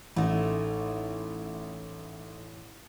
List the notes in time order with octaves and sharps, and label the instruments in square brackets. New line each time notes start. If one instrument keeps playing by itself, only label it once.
[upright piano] A1 [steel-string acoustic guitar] A3 D#4 E4